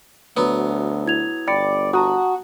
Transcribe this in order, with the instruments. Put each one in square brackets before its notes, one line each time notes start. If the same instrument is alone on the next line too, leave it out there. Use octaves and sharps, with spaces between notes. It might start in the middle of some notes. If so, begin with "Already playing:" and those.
[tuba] D2 [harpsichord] F#3 B3
[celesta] E4 G#6 F7
[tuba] G1 [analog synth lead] D5 [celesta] G5 B5 C#7
[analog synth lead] F#4 [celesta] A5 A#5 D#6